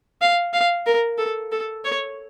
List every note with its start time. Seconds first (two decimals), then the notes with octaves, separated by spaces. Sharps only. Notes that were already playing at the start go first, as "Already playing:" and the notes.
0.21 F5
0.53 F5
0.86 A#4
1.18 A4
1.52 A4
1.85 C#5